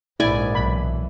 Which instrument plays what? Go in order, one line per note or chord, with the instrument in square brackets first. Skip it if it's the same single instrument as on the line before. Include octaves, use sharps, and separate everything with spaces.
[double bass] A#1 G#2 [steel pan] E4 [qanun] D5 G#5
[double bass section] B1 E3 [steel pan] B5